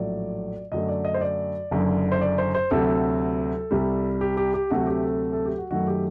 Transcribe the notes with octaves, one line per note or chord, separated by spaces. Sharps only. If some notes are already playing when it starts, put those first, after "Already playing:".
Already playing: A#1 A2 F#3 A3 D5
F#2 D3 F#3 A3 D#5
D5
D#5
C5
D5
F#1 F#2 D3
C5
D5
C5
C5
D2 C3 F#3 A4
C2 C3 G3
G4
G4
G4
D2 C3 F#3 A3 F#4
G4
A4
A4
G4
F#4
F#2 D#3 F#3 A3 F#4
G4